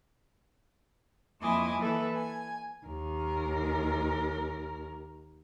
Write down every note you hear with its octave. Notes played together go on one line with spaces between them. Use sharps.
F2 A#3 E4 D#5 G#5 D6
E3 A#3 A4 B4 E5
G#5
D#2 A#4